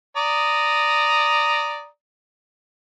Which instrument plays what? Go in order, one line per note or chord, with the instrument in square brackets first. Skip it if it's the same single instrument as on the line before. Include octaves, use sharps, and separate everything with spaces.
[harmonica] D5 A#5 D#6